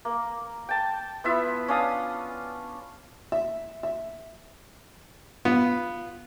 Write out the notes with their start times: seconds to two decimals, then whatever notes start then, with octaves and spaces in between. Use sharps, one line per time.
0.05 A#3
0.69 G5 A5
1.24 B3 E4 F4 E5
1.68 C#4 D4 F5 D#6
3.32 E5
3.83 E5
5.45 B3 F4